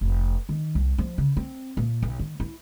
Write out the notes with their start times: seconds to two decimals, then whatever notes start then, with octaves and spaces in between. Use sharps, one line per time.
0.01 F1
0.49 D#3
0.75 C2
0.98 F3
1.18 C#3
1.37 C4
1.77 A#2
2.02 B1
2.19 D#3
2.40 E4